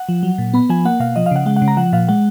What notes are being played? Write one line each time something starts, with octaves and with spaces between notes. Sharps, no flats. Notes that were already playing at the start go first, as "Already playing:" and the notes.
Already playing: F#5
F3
F#3
A#2
B3 B5
F3 G#5
A#3 F#5
B2 F5
F3 D#5
F5
C#3 F#5
G#3 F#5
F#5
C#3
A#5
F3 F#5
A#2 F5
G#3 F#5